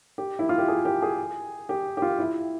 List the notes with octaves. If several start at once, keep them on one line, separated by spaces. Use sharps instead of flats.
G4
E4
F4
G4
G#4
G4
G#4
G4
G4
F4
E4